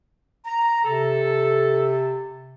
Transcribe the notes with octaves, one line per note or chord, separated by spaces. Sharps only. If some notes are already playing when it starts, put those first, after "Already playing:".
A#5
C3 A4